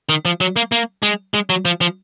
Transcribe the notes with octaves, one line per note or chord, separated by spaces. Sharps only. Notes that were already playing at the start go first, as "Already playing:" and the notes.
D#3
F3
F#3
A#3
A#3
G#3
G#3
F#3
F3
F3